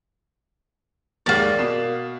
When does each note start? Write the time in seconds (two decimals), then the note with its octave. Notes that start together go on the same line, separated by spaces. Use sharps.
1.26 A#1 D#2 G#2 A#3 D5
1.59 B2 C7 E7